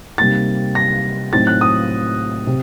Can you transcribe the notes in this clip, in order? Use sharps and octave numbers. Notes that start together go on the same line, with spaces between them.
C3 G3 A#3 D#4 A6
A#6
A2 F#3 C4 D#4 A6
F#6
D#6
C3